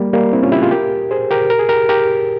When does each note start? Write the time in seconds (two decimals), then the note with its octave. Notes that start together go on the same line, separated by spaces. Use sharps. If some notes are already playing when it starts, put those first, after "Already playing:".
Already playing: G3 A#3
0.13 G3 A#3
0.33 C4 E4
0.43 C#4 F4
0.52 E4 G4
0.61 F4 G#4
0.71 G4 A#4
1.11 G#4 C5
1.31 G4 A#4
1.50 A#4
1.59 G#4
1.69 G4 A#4
1.89 G4 A#4